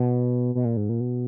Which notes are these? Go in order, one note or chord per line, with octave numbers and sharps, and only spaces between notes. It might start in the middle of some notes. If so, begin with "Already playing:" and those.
Already playing: B2
B2
A#2
G#2
A#2
B2